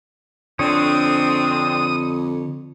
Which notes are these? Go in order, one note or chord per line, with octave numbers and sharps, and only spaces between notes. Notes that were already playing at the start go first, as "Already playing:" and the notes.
F2 D3 C4 D4 C#5 D#6